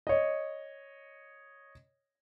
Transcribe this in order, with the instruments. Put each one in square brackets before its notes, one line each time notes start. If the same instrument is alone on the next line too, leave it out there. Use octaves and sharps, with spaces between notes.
[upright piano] C#5 D#5